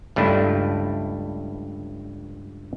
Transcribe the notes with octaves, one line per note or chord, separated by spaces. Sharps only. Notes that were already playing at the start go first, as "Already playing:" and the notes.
C#2 G2 A3 D4 E4